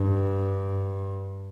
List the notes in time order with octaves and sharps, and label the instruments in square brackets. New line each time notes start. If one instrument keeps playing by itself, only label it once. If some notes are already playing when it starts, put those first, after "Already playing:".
Already playing: [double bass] G2